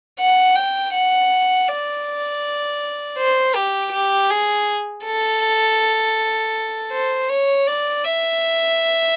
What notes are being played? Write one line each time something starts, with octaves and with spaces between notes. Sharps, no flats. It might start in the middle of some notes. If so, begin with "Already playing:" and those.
F#5
G5
F#5
D5
C5
G4
G4
G#4
A4
C5
C#5
D5
E5